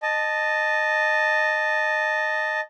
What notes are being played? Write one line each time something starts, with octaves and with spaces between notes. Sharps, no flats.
D#5 A5